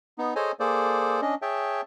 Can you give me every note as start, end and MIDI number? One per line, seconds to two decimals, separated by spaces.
0.18 0.34 59
0.18 0.34 63
0.36 0.52 68
0.36 0.52 69
0.36 0.52 72
0.36 0.52 73
0.36 0.52 75
0.36 0.52 80
0.60 1.21 58
0.60 1.21 68
0.60 1.21 69
0.60 1.21 72
0.60 1.21 74
1.22 1.35 61
1.22 1.35 62
1.22 1.35 75
1.42 1.81 68
1.42 1.81 73
1.42 1.81 76
1.42 1.81 79
1.42 1.81 81